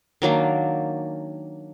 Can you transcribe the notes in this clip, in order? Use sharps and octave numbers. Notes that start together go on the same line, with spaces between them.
D#3 F#3 A#3 D4